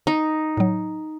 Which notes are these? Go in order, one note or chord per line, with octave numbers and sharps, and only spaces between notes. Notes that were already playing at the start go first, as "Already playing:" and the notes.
D#4
A2 F#3